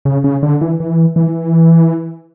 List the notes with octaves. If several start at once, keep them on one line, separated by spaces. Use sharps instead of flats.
C#3
C#3
D3
E3
E3
E3